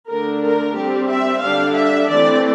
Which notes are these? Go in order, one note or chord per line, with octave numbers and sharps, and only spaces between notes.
D3 A3 D4 A#4
A#4
G3 C4 G4
E5
D3 G3 D4 F5
E5
E3 A3 C4 D5